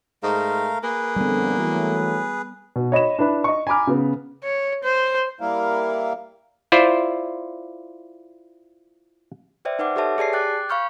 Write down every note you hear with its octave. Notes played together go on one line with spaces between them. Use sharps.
G#2 A3 A#4 F5
A#3 G#4 B4
F2 D3 G3 B3
E3 F#3 A3
B2
C#5 D#5 B5 E7
D4 E4 B4 B5
D#5 C#6
G#5 A#5 B5 D6 F6
C#3 B3
C#5
C5
G3 A#3 E4 A#4 F5
E4 F4 C5 D5
B4 C5 D5 E5 G5
D#4 B4 F#5 D6
G4 A4 B4 C#5 E5 A5
G4 G#4 D5 A5 C7
G5 D6 F#6 A6
F5 B5 C#6 F6 G6